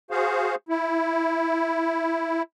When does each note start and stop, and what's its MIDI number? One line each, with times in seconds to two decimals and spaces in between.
0.11 0.55 66
0.11 0.55 68
0.11 0.55 72
0.11 0.55 77
0.69 2.42 64